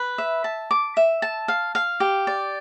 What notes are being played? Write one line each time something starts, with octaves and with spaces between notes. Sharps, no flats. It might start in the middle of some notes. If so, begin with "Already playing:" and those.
Already playing: B4
E5
A5
D6
E5
A5
F5
F5
G4
D5